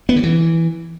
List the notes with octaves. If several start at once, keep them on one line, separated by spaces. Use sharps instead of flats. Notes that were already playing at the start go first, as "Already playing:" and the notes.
B3
D3
E3